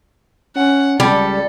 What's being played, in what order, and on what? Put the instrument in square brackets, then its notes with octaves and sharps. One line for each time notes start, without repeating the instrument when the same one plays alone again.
[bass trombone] C#4 [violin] F#5
[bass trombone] C#2 [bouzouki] G3 [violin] A4